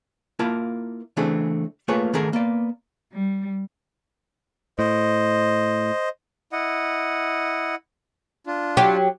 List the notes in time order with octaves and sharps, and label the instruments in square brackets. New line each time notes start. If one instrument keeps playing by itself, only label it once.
[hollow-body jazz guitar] A#3 E4 F4 A#4 A5
C#3 E3 A3 C4 D4 G#4
A3 A#3 F4 G#4 B4 C#5
D#3 A3 C#4 G#4 A#4
A#3 B3 D5
[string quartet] G3
[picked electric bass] A2 [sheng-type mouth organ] C5 D#5
[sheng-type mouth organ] E4 D#5 F#5
D4 F4
[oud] F#3 G4